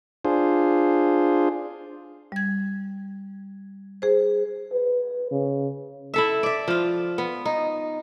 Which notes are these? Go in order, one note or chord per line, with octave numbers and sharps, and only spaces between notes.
D4 F4 G#4 C5
G3 G#6
G#4 C5
B4
C#3
E4 A4 E5
D5 E5
F3 F4
B3
D#4